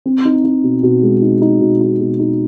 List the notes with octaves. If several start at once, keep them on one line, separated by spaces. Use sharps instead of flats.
C4
D#4
D#4
B2
B2
G#3
D#4
D#4
B2
D#4
B2
D#4